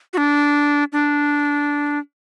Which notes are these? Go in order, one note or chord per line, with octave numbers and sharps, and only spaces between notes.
F#4
D4
D4